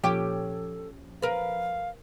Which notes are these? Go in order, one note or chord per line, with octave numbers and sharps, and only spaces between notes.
A#2 F3 C#4 G4 A4 C#5 G5
A#4 B4 F5